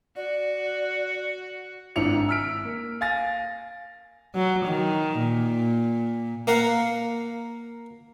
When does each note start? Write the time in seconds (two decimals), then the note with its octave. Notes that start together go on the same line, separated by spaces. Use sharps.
0.16 F#4 D5
1.96 G#1 G#2 D4 E4 C#7 F7
2.29 E6 F6 B6 D7
2.65 A#3
3.01 F5 G#5 A6 A#6
4.35 F#3
4.65 D#3
5.17 A#2
6.47 A#3 A#4 F5 F#5